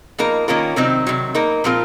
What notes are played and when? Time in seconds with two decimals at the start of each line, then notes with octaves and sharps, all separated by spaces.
0.18 F3 A#3 D#4 A#4
0.48 D#3 A#3 C#4 F4 A#4
0.76 C3 D#3 F#3 C4 D#4
1.07 C3 D#3 F#3
1.35 A#3 D#4 A#4
1.64 A#2 F3 C4 F4 A#4